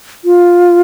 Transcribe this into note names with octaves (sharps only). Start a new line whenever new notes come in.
F4